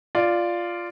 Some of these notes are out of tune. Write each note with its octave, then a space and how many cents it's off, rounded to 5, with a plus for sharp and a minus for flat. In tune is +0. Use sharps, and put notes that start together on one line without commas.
F4 -5 D5 +0